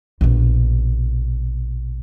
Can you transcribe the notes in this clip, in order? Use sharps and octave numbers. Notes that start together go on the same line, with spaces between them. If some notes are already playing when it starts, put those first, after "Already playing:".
A#1 B2